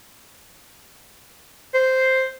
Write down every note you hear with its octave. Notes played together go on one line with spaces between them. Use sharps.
C5